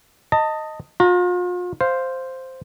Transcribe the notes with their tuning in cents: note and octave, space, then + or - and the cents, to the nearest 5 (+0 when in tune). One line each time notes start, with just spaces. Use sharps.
D#5 +0 A5 +30
F4 +40 A#5 +0
C5 +0 F5 +0